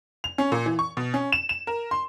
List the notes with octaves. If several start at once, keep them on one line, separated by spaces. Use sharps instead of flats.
F7
C#4
A#2
E3
C#6
B2
C#4
E7
E7
A#4
C6